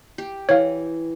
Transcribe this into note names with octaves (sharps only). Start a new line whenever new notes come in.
G4
E3 C#5 F5